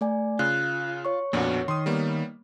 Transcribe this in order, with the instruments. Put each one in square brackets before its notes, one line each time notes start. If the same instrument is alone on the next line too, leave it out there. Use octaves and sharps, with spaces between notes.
[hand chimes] A3 D5 G#5
[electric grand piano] C#3 [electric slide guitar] F4 [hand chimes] F#6
[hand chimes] C#5 C#6
[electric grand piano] F2 A#2 D4 [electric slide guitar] A#3 B3 F#4
[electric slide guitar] D#3 [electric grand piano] C6 D#6
[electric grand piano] G3 A#3 B3